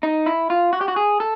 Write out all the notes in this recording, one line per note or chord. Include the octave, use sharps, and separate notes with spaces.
D#4
E4
F4
F#4
G4
F#4
G#4
A4